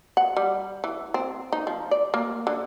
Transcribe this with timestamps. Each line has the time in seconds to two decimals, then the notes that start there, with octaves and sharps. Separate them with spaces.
0.17 F#5
0.37 G3
0.84 E3
1.14 C4
1.52 D#4
1.67 F3
1.91 D5
2.14 A#3
2.47 D3